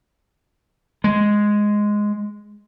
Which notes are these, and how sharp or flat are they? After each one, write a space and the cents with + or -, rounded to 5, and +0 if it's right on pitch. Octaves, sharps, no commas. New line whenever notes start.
G#3 +0